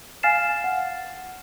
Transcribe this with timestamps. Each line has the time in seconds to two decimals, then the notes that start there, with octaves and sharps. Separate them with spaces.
0.23 F5 G#5 F6 A6 C7 E7
0.64 F#5